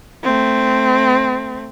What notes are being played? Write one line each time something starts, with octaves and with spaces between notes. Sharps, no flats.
A3 C4